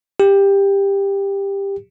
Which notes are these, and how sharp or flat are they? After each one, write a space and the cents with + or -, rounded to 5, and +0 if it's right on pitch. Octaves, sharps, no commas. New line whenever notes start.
G4 +15